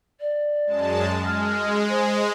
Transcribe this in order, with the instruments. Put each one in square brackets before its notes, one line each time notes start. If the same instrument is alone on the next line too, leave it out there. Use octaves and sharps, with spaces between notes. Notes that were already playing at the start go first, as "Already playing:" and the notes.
[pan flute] D5
[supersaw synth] F#2 G#3 A5
[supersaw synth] G#3 [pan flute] F6
[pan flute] C5